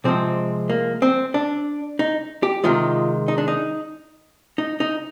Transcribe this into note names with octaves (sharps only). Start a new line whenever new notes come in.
C3 F3 G#3 C4
A#3
C4
D4
D#4
G4
C3 D#3 G#3 F4
D#4
D4
D#4
D#4
D#4